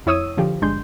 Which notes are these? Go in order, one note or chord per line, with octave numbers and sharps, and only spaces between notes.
F2 E4 C#5 D#6 E6 D#7
D3 F3 G4
G1 G#3 D4 C6 G6